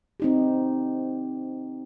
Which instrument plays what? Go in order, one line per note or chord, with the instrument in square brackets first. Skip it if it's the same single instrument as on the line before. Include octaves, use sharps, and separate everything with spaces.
[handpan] C4 D#4 G4